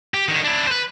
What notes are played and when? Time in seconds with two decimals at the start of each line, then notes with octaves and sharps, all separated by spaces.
0.14 G4
0.28 D3 D#3
0.44 D4 E4
0.67 B4 C5